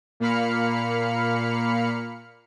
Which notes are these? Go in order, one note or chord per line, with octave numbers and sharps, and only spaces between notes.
A#2 A#3 F5 B5 F6 C#7